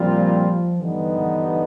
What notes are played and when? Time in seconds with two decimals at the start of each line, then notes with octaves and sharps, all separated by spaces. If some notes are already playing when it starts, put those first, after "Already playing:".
Already playing: A#2 F3 G3 C4 F4
0.80 G2 D3 E3 G3 B3 D#4
1.18 E3